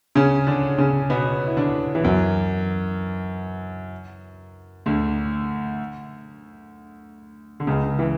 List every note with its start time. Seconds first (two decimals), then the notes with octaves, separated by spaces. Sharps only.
0.15 C#3 C#4
0.47 D3 D4
0.78 C#3 C#4
1.10 B2 B3
1.46 E4
1.57 D3 D4
1.95 E3
2.04 F#2 F#3
4.86 D2 D3
7.60 D3
7.67 C#2 C#3
7.99 E3